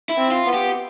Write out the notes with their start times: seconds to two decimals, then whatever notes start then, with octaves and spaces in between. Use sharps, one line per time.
0.10 E4
0.17 C4
0.31 F4
0.47 B3
0.54 G4